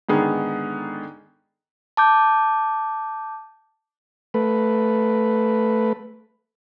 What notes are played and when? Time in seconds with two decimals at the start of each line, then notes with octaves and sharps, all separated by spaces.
0.09 G#2 D3 D#3 B3 G#4
1.97 A5 D6 G6
4.34 A3 B4